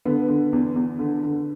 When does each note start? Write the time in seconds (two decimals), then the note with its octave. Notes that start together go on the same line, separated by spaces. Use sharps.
0.05 D3 B3
0.28 D3
0.53 E2
0.76 E2
0.99 D3
1.23 D3